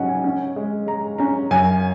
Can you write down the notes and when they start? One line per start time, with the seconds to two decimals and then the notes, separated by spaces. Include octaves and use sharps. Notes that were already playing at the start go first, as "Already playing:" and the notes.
Already playing: G#2 F#3 C#4 D#5 F#5
0.08 G#5
0.24 C#4
0.56 G#3
0.87 G#3 A#5
1.18 C#4 A#5
1.51 F#2 G#5